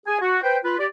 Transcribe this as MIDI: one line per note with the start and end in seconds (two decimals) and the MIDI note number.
0.06 0.18 68
0.06 0.18 80
0.21 0.41 66
0.43 0.58 71
0.43 0.58 72
0.43 0.58 79
0.65 0.77 65
0.65 0.77 71
0.79 0.86 67
0.79 0.86 74